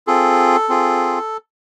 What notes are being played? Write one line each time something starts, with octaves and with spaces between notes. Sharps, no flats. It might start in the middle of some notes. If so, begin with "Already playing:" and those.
C4 F4 G#4 A4
C4 F4 G#4